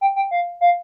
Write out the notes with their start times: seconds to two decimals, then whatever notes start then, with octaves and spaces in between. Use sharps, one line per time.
0.01 G5
0.16 G5
0.31 F5
0.61 F5